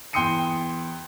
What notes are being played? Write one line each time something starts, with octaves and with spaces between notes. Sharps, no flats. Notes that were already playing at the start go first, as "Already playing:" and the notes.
E2 G5 C6 D#6 C#7 D#7